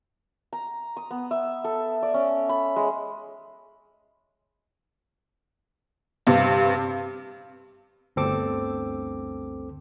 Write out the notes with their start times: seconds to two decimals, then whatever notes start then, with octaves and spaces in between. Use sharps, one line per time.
0.53 A#5
0.97 D#6
1.11 B3
1.31 E5
1.64 A4
2.02 D5
2.14 C#4
2.49 B5
2.76 G#3
6.27 G2 C3 F5
8.16 G1 D2 C4 A4 D6